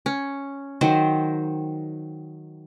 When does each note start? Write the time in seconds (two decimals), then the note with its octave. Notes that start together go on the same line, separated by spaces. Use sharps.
0.06 C#4
0.81 D#3 F#3 C5